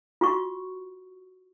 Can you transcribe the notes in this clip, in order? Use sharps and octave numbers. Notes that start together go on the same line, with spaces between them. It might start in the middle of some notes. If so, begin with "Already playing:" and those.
F4 F#4 C#6